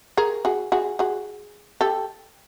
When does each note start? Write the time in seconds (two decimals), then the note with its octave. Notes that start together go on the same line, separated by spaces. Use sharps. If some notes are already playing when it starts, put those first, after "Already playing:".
0.17 G#4 A#4
0.45 F#4 G#4
0.72 F#4 G#4
0.99 F#4 G#4
1.81 G4 A4